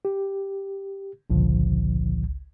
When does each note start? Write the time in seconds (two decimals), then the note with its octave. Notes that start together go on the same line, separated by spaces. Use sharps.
0.05 G4
1.30 G#1 C#2 A#2 D3 F3